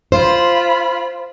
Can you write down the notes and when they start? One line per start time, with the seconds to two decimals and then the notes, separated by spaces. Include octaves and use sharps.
0.12 F4 C5 B5